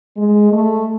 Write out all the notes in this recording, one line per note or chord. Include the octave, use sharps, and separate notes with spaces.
G#3
A3